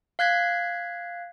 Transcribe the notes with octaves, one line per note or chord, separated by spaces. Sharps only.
F5 F#6 G#6 B6